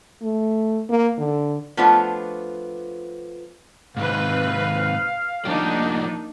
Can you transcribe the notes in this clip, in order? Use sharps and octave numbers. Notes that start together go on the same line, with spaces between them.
A3
A#3
D3
F3 A3 B3 D4 F4 C5
G#2 C3 D#3 C4 B4 F5
F3 G3 A#3 D4 D#4 G4